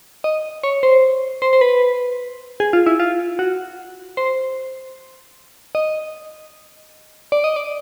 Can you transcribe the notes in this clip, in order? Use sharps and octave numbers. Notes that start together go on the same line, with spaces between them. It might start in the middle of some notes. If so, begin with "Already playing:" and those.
D#5
C#5
C5
C5
C5
B4
G#4
F4
E4
F4
F#4
C5
D#5
D5
D#5
D5